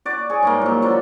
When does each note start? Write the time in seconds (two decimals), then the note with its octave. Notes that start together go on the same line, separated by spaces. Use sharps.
0.05 F#4 D5
0.30 G#4 C#5
0.43 G#2 G3 A#3
0.61 F3 F#3
0.82 D3 F3 F#3